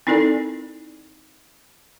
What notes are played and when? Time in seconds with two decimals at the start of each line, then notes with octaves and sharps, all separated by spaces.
0.07 C4 D#4 E4 A4 A#4 D5